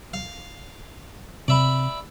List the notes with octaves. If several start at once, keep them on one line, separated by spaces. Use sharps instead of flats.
F5
C3 D5 E5 B5